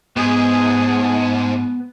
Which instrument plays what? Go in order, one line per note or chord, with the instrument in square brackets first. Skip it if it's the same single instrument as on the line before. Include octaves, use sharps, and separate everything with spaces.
[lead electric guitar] G#2 [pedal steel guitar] B3 [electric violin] G#4
[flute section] F#5 A5